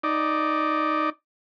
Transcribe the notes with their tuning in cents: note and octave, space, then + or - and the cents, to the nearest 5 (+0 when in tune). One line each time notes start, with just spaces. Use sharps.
D#4 +0 D5 +0